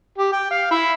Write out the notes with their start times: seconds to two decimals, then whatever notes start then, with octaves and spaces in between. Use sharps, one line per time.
0.18 G4
0.33 G5
0.51 F5
0.71 E4